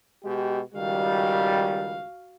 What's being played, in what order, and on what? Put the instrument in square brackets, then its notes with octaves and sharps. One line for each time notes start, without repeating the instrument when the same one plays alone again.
[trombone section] B2 G#3 G4
[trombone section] C#2 D#3 G3 [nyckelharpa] F#4 F5